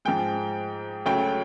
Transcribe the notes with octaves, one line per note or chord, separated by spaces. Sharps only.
G#2 F3 G#3 G5
D2 C#3 F#3 A3 G5